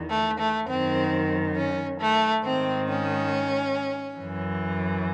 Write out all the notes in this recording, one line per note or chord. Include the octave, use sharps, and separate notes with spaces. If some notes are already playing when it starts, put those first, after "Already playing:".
Already playing: E2 D#3
A3
A3
F#2 D#3 C4
C#4
A3
G#2 D#3 C4
C#4
F#2 E3